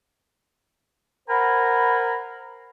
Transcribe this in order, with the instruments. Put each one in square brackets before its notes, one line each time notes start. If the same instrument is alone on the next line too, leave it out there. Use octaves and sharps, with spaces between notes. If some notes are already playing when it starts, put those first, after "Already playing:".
[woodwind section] A#4 C5 F#5 G#5 A#5 B5